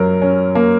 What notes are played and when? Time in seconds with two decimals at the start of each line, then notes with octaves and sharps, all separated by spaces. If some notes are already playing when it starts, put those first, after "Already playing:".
Already playing: F#2 F#3 A#4
0.22 C#4
0.55 A#3